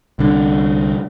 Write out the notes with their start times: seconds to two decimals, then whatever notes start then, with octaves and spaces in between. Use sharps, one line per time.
0.19 C2 D3